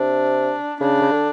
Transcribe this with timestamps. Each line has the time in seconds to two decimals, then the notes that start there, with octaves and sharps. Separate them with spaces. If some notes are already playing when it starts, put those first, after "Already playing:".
Already playing: C3 D4
0.80 C#3 D4
1.01 C#3
1.11 D3